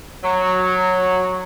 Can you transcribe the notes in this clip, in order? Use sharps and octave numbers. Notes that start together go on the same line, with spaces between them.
F#3